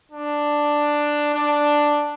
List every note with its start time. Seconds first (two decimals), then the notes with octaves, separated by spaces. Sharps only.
0.11 D4
1.34 D4